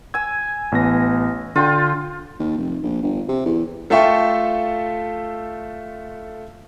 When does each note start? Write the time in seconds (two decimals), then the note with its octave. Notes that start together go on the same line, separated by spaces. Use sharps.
0.14 G#5 E6 G#6
0.72 A1 B3 A#6
1.55 D3 F4 G5 C6
2.40 D#2
2.58 F1
2.83 A#1
3.03 G1
3.29 C3
3.46 E2
3.90 A3 F4 A4 E5 G5 C#6